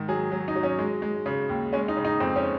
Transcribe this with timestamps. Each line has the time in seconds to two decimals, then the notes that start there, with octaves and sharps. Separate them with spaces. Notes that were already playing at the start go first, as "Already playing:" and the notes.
Already playing: G#2 D#3
0.08 F#3 G#4
0.32 F#3
0.48 D#4
0.55 F#3
0.63 C#4
0.79 G#3
1.02 G#3
1.26 C#3
1.49 D#2
1.73 G#3 C#4
1.88 D#4
1.97 C#3
2.05 D#4
2.20 F2 C4
2.36 C#4